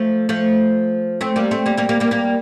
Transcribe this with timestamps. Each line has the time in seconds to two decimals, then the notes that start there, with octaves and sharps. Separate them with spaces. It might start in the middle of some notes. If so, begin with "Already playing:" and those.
Already playing: F3 A3
0.29 F3 A3
1.21 A3 C4
1.36 G3 A#3
1.51 A3 C4
1.66 G3 A#3
1.77 G3 A#3
1.89 G3 A#3
2.00 G3 A#3
2.11 G3 A#3